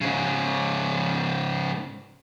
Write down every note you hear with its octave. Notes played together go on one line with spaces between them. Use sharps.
G#2 C#3